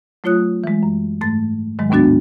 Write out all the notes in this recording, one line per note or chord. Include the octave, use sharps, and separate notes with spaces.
F#3 A3 F4 C#5 D#6 F#6
E3 G#3
F#2
G#2 A3 A6
G#2 D#3 F#3 G#3
D#2 A2 B3 D4 F#4 A6